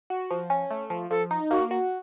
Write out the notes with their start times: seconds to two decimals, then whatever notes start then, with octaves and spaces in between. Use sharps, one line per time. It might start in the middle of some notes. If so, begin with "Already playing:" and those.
0.10 F#4
0.31 F3
0.50 C#4
0.71 A3
0.90 F3
1.10 F3 A4
1.31 D#4
1.51 A#3 F#4
1.71 F#4